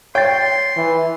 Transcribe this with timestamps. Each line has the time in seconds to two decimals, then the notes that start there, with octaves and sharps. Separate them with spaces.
0.15 C#5 G5 C6 A6
0.76 E3